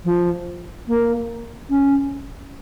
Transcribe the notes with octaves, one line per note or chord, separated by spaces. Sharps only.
F3
A#3
C#4